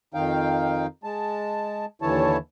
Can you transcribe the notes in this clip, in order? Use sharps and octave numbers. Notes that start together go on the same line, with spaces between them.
F2 D#3 D#4 F5 G5
G#3 A5
D#2 D3 E3 E4 C#5 A5